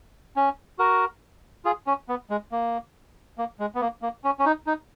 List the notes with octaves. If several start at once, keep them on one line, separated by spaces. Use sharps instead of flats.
C#4
F#4 A#4
F4 G#4
C#4
B3
G#3
A#3
A#3
G#3
B3
A#3
A#3
C#4
C#4
D#4
D#4